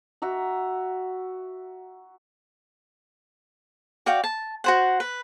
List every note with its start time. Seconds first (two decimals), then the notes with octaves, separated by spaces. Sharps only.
0.22 F#4 E5 A#5
4.06 F#4 D5 F5 G5
4.24 A5
4.64 F#4 C5 F#5
5.00 B4